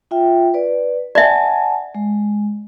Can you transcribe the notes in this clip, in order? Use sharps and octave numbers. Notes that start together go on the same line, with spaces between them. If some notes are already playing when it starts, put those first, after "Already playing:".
F4 E5 G5
B4 D5
D5 E5 F#5 G#5 A5
G#3